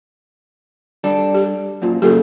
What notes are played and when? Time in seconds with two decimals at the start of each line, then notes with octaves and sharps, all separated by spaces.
1.04 G3 D4 A4
1.34 G4
1.82 F#2 A#2 F3
2.02 F#2 A#2 C#3 G4 A4